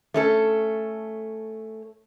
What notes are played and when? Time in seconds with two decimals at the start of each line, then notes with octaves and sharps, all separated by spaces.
0.14 A3 C#4 A4